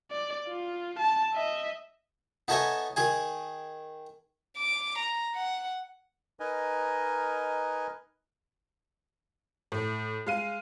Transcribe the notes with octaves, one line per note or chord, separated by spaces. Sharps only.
D5
F4
A5
D#5 E5
B3 D#4 A4 C#5 E5 G#5
D#3 G#4 G#5
D6
A#5
F#5
D#4 A#4 B4 D#5 G#5
A2
G#3 F5 D#7